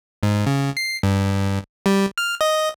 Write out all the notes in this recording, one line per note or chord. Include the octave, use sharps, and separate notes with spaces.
G#2
C#3
C7
G2
G3
F6
D#5